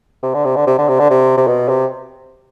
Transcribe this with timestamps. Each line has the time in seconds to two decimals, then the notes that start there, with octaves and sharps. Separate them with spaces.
0.23 C3
0.34 D3
0.45 C3
0.56 D3
0.67 C3
0.78 D3
0.88 C3
1.00 D3
1.10 C3
1.37 C3
1.47 B2
1.68 C3